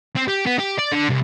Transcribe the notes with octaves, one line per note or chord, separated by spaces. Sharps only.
C4
G4
B3
G4
D5
D3
C2